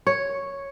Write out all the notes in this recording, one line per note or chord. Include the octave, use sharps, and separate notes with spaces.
C#5